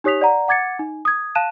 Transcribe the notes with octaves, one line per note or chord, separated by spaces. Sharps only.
D#4 G4 C#5 D#6 B6 F7
D5 F#5 A#5
F#5 D6 G#6 A6 C#7
D#4
D#6 G#6
F5 A5 F#6 D#7 E7